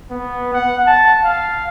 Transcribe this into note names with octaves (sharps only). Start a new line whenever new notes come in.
B3
F#5
A5
F5